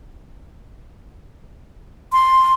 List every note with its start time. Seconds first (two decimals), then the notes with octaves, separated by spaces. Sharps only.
2.12 C6